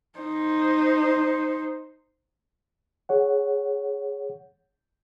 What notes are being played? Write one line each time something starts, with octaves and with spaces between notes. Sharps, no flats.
D#4 C5
G#4 C#5 F#5